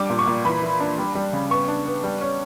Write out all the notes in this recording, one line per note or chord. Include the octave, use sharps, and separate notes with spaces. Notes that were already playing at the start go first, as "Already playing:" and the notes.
Already playing: G3 D4 D6
A#2
C#6
A#2
E3 B5
E3
D4
G3
G3
C#3
B3 C#6
D4
B3
G3
C#4